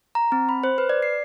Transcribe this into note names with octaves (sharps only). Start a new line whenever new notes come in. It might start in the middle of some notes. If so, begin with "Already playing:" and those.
A#5
C4
B5
C5
B4
D5
C7